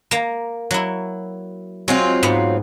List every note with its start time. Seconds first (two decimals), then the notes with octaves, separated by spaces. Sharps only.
0.11 A#3 A#5
0.71 F#3 E4
1.88 F#3 G#3 C4 F4
2.23 G#2 B3